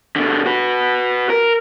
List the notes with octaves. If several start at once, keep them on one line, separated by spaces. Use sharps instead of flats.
B2 D3
F#4 B4
A#4